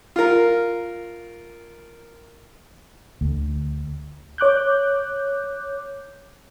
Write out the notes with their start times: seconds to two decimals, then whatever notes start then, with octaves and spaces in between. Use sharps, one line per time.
0.16 F4 A#4
3.21 D2
4.38 C#5 D6 F#6 G6